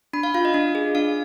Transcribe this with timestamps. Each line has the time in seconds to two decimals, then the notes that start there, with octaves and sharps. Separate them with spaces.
0.13 D4 B5
0.23 F5
0.34 F4 F5
0.45 D#5
0.54 D4
0.75 G#4
0.95 D4 F5